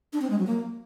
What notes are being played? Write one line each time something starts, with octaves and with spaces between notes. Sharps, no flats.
D4
C4
G#3
F#3
A#3